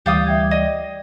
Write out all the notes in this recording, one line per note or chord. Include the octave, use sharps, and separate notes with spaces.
D2 E3 G3 G4 F5 D#6 G6 A6
E5 G5 G#6
D5 D#5